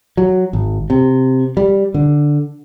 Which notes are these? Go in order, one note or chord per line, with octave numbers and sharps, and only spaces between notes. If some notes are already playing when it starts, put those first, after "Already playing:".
F#3
G#1
C3
G3
D3